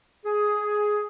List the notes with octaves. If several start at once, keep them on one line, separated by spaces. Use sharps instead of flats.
G#4